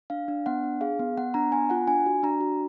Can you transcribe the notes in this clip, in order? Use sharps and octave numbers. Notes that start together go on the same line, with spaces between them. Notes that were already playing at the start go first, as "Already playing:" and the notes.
D4 F5
D4
B3 F#5
D4
G#4 F5
B3
B3 F#5
D4 A#5
B3 G#5
F4 F#5
D4 G#5
F#4
D4 A#5
F#4